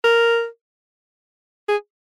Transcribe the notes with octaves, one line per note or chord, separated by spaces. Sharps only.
A#4
G#4